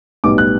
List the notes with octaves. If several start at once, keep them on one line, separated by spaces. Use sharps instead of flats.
B1 A2 G3 B3 D6
F#6